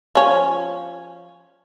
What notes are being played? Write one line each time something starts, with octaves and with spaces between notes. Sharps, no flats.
F3 C#4